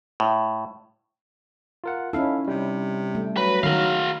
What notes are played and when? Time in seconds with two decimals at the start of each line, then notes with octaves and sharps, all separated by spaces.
0.20 A2
1.84 F4 A#4 F#5
2.13 C#4 D#4 E4 A4 F5
2.47 C3 G3
3.15 A3
3.37 F#3 B4
3.63 D#3 F#4 A#4 F5